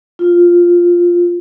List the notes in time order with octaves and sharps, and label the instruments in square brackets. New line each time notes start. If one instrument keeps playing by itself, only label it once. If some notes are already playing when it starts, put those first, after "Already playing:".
[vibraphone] F4